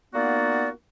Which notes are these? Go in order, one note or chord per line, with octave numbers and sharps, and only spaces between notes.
A#3 B3 D#4 F4 F#4 D5